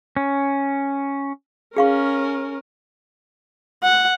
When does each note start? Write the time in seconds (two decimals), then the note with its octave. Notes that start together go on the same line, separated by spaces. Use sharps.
0.17 C#4
1.77 C#4 G#4 A#4 F5 C#6
3.84 F#5